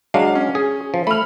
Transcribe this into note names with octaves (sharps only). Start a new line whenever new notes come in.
F#3 G#3 D4 F5
C#4
G#4
F3
A3 B5 F6